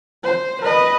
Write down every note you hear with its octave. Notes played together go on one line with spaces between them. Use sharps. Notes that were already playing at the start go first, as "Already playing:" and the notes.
C5
B4 D#5